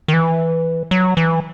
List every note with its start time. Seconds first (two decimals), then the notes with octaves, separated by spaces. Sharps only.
0.08 D#3
0.13 E3
0.91 F#3
1.17 E3